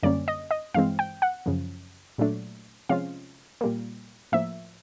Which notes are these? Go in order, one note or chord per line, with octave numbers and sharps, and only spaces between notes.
F#2 D3 G3 A#3 C#4 D5
D#5
D#5
G2 E3 G#3 C4 F5
G5
F#5
F#2 C#3 F3
A#2 F#3 A3 D4
C3 F3 G#3 C#4 F4 F5
A#2 G3 A#3
A2 F3 A#3 E5